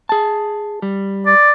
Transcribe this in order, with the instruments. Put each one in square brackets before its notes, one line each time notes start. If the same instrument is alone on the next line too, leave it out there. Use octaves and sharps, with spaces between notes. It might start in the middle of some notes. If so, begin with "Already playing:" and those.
[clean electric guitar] G#4 A5
G3
[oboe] D5